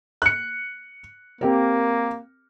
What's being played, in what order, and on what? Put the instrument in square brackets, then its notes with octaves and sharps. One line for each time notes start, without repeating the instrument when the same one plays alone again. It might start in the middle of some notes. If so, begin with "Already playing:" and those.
[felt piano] F#6 C#7
[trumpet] A#3 [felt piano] C4 G4 A#4